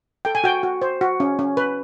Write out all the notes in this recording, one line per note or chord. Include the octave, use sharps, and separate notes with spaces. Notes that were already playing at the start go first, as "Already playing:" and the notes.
A4 G5
G#5
F#4 G5
F#4
C5
F#4
C#4
C#4
B4